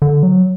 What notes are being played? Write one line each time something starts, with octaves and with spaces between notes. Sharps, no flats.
D3
F#3